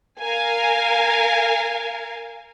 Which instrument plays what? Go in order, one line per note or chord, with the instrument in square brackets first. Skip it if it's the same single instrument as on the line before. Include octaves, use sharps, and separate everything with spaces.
[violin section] A#4 F5 G#5